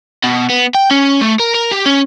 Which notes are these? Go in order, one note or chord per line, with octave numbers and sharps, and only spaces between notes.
B2
B3
G5
C#4
A3
A#4
A#4
G4
C#4